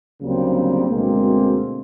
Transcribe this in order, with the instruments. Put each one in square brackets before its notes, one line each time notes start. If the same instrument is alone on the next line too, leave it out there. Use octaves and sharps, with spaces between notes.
[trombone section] D2 C#3 F#3 G3 A#3 C4
D2 B2 G#3 A#3 C4